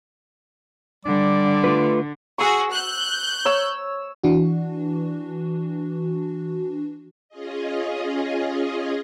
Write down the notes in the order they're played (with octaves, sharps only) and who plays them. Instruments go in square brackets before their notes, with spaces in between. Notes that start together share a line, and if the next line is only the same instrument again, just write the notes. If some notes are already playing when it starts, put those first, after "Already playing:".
[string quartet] D3 [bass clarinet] G3 [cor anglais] D5
[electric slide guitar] A3 F4 B4
[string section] F#4 G#4 [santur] C#6 E6
[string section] F#6 G6
[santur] C#5 E6
[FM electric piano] E3 D4 F#4
[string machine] C#4 F4 G#4 D#5